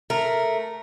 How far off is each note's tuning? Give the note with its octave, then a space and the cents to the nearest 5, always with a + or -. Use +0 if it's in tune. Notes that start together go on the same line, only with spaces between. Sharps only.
A3 +0 A#4 +0